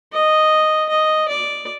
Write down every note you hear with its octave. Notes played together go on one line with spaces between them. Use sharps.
D#5
D#5
D5